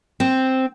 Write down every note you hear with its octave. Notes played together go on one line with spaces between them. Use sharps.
C4